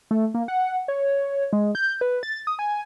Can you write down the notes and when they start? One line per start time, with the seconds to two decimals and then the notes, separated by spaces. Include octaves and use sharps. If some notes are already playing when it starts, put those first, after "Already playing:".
0.11 A3
0.34 A#3
0.48 F#5
0.88 C#5
1.53 G#3
1.75 G6
2.01 B4
2.23 A6
2.47 D#6
2.59 G#5